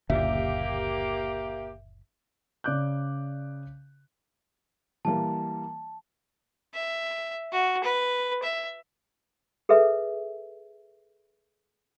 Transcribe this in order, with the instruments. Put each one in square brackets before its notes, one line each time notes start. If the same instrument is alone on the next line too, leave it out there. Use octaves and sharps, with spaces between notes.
[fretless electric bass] F#1 D2 A#2 [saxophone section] A#3 G4 [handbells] E5
[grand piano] C#3 D5 D6 F#6 G6
[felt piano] E3 G3 A#3 [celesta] A5
[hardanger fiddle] E5
F#4
B4
E5
[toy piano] G#4 A4 B4 E5